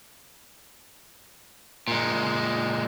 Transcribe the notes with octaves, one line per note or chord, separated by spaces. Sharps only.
A#2 G#3